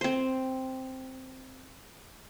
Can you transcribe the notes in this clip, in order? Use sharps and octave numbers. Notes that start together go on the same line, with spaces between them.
C4 C5